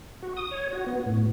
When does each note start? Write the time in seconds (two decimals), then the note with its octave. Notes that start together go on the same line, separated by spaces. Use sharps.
0.22 F#4
0.37 D#6
0.51 C#5
0.73 F#4
0.87 B3
1.06 A2